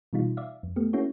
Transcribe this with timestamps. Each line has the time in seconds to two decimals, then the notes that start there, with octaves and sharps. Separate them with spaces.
0.13 B2 E3 G3 D#4 F4
0.37 D5 E5 F5
0.63 F2
0.76 A3 B3 G4
0.93 A#3 C#4 E4 F#4 G#4 C#5